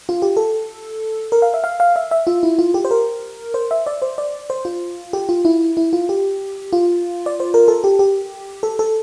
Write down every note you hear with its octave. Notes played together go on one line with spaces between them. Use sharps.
F4
G4
A4
A#4
F5
E5
F5
F5
E5
E5
F4
E4
F4
G4
C5
A#4
C5
E5
D5
C5
D5
C5
F4
G4
F4
E4
E4
F4
G4
F4
D5
C5
A#4
A4
G4
G4
A4
A4